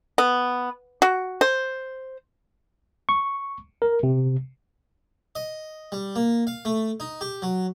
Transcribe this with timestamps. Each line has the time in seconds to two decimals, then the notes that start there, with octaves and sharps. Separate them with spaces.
0.18 B3
1.02 F#4
1.41 C5
3.09 C#6
3.82 A#4
4.03 C3
5.35 D#5
5.92 G3
6.16 A#3
6.47 F5
6.65 A3
7.00 D#4
7.21 G4
7.42 F#3